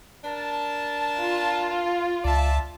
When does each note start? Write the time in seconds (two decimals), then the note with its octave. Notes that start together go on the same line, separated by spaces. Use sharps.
0.24 D4 A#4 A5
1.20 F4
2.25 C#2 D5 E5 A5